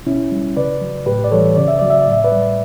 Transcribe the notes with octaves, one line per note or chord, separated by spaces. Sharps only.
B2 C#4 E4
G3
C#3 B4 D5
F#3
A2 G4 B4
D5
E3 G3 A4 C#5
C#3 D5
E5
F#3 D5
E5
D5
A2
E5
B4 D5
G3